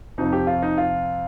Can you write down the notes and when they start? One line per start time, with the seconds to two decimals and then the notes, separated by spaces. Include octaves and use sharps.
0.18 F2 C3 F3 D#4
0.33 G4
0.47 F4
0.62 D#4
0.78 F4